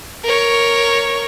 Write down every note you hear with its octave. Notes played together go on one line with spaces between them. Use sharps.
A#4 C#5